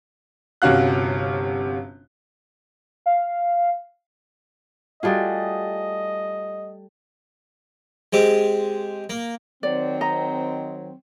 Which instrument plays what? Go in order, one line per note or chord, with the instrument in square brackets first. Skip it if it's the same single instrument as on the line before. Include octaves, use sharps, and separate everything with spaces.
[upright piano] G1 C3 C#4 F#4 F5 F#6
[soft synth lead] F5
[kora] G3 A3 G#4 [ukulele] F4 F#4 [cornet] D#5
[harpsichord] G#3 C4 G4
A#3
[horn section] D#3 F#3 C4 [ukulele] D5
[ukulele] D#5 A#5